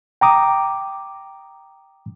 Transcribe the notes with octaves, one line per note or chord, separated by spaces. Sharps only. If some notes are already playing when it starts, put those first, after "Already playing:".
G5 A#5 D6 D#6